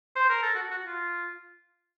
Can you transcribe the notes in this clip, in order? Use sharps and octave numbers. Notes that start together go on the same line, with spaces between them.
C5
A#4
A4
F#4
F#4
F4